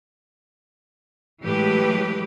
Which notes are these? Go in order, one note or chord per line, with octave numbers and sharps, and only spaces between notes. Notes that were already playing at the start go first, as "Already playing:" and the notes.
A2 E3 F#3 G#3 G4 B4